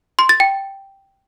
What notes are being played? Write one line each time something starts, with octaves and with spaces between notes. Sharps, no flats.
C6
A6
G5